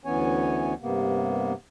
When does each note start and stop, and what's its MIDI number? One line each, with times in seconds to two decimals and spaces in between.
0.05 0.73 38
0.05 0.73 52
0.05 0.73 59
0.05 0.73 61
0.05 0.73 73
0.05 0.73 80
0.82 1.53 43
0.82 1.53 48
0.82 1.53 58
0.82 1.53 59